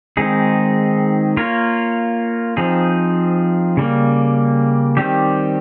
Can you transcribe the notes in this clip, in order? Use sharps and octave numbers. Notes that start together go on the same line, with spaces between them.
D#3 G#3 C4 D#4 G#4
A#3 F4 A#4 C#5
F3 C4 D#4 G#4
C#3 G3 A#3
D#3 G3 C4 G4